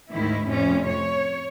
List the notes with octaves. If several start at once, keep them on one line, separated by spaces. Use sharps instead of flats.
D2 G#2 D#3 E4
F2 A2 C3 C#4
C#5